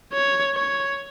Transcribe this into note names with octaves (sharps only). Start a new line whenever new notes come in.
C#5
C#5